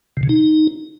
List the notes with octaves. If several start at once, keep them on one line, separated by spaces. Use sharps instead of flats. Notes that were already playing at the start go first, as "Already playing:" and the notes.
C3
C#3
D#4